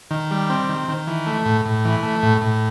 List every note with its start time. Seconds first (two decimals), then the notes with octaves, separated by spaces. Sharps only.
0.11 D#3
0.31 G3
0.49 C4
0.69 D#3
0.88 D#3
1.07 E3
1.26 A3
1.46 A2
1.65 A2
1.85 E3
2.03 A3
2.23 A2
2.41 A2